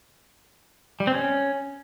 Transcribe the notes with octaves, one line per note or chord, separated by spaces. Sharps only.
G3
C4
C#4